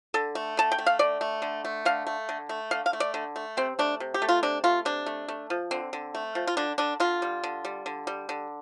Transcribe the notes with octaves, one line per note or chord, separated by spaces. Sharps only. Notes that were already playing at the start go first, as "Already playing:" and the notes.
D3 A4
A3
D3 A5
G5
A3
F5
D3 D5
A3
D3
A3
D3 F5
A3
D3
A3
D3 F5
F5
A3
D5
D3
A3
C3 C4
A3 D4
C3
G4
A3
F4
C3 D4
A3 F4
C3 D4
A3
A3
F3
D3 C4
D3
A3
F3
F4
D3 D4
D3 D4
D3 F4
G3
D3
G3
D3
G3
D3